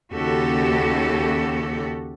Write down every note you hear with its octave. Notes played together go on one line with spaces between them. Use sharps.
D#2 C#3 F#4 G4 A4